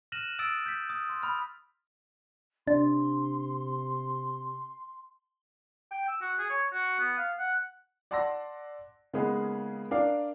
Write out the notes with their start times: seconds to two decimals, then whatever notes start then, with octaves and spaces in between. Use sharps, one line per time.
0.12 F6 F#6 A#6 D#7 E7 F#7
0.39 D#6 E6 A6 D7
0.66 G6 B6
0.90 D#6
1.09 C6
1.23 B5 D#6 F6
2.67 C3 D4 C6
5.92 G5
6.08 E6
6.21 F#4
6.38 G#4
6.50 C#5
6.73 F#4
7.00 B3
7.18 F5
7.39 F#5
8.11 D5 F#5 A5 C6 E6 A#6
9.13 C#3 G#3 A#3 B3 D#4 G#4
9.91 D4 A#4 D5 F5